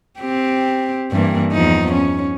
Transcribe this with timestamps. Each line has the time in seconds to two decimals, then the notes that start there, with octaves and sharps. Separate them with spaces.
0.20 C4 G4
1.12 G2 E3 A#3
1.52 E2 F3 D#4
1.93 C#4